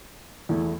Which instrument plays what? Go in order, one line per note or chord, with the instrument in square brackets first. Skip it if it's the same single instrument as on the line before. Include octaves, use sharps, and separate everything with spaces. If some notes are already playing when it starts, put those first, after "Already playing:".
[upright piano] E2 E3 A3 E4